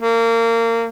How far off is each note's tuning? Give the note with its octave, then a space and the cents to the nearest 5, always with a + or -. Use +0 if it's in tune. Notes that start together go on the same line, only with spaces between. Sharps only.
A#3 -25